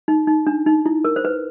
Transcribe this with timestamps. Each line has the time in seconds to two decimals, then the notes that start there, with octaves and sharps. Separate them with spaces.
0.08 D#4
0.27 D#4
0.47 D4
0.66 D#4
0.86 E4
1.04 A#4
1.16 C5
1.25 B4